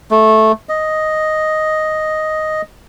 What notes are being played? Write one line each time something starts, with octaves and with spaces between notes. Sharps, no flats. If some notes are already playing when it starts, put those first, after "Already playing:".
A3
D#5